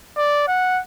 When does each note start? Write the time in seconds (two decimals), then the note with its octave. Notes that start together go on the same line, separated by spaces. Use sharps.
0.17 D5
0.48 F#5